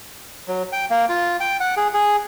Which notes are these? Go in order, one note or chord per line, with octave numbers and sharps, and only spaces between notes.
F#3
G5
A#3
F4
G5
F#5
G#4
G#4